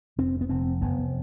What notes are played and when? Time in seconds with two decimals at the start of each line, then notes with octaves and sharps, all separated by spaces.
0.18 F1 C4
0.41 B3
0.49 F1 C4
0.81 F1 B3